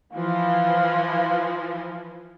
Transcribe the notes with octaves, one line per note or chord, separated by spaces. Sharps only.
E3 F3 F5